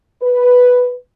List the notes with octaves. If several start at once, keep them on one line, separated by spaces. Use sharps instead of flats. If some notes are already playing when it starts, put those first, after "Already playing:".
B4